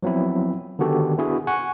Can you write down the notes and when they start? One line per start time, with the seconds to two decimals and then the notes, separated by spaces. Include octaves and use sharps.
0.03 F3 F#3 B3 C4 E4
0.79 D3 D#3 B3 F#4 G4 A4
1.18 B3 D4 E4 F#4 G#4
1.47 F#5 G#5 C#6